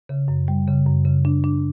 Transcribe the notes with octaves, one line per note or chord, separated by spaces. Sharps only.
C#3
F#2
G3
C#3
F#2
C#3
D4
D4